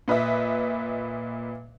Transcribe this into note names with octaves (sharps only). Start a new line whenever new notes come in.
A#2 B4 D#5 E5